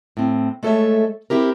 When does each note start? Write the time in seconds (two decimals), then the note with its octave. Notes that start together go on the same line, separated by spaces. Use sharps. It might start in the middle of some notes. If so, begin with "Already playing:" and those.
0.17 A2 C4
0.63 G#3 A3 A4 A#4 C#5 E5
1.30 C4 E4 G4 A#4